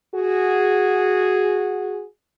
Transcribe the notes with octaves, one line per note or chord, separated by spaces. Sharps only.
F#4 G#4